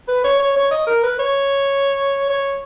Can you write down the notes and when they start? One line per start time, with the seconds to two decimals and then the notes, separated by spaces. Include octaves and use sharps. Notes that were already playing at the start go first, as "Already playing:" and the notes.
0.08 B4
0.24 C#5
0.40 C#5
0.56 C#5
0.71 D#5
0.87 A#4
1.03 B4
1.19 C#5
2.30 C#5